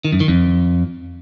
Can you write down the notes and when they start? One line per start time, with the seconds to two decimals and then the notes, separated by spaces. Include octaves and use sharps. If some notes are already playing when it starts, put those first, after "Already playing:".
0.05 D#3
0.12 F#2
0.20 D#3
0.28 F2